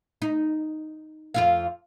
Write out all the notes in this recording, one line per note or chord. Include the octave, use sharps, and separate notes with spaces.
D#4
F2 F4 F5